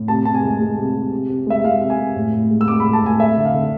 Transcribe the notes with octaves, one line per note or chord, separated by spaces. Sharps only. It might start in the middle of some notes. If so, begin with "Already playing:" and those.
Already playing: A2
C3 A5
C3 A5
G#5
G#3
G#3
C3
C3
C3
C3
G#3 E5
G#3 F5
C3
G#5
C3
A2
A2
G#3
E6
G#3 D6
B5
A2
A5
A2 G#5
A3 E5
D3
F5
D3